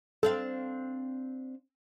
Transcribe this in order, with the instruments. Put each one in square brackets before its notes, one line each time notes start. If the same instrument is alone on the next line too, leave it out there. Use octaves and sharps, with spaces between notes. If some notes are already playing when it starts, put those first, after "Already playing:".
[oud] C4 D4 F5 [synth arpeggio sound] A4